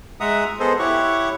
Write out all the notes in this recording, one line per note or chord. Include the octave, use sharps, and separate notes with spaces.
G#3 E5 F#5 A#5 D#6
B3 G#4 A4 C5 D#5
E4 G4 C#5 F#5 C#6